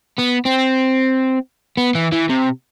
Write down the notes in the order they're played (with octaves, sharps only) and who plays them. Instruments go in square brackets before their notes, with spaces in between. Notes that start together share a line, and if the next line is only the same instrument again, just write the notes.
[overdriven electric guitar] B3
C4
B3
E3
E3
C3